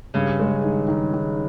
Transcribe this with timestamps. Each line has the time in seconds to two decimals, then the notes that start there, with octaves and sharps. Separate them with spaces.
0.14 G2 C#3 C#4
0.39 G#3
0.64 D#3
0.88 D#3
1.13 D#3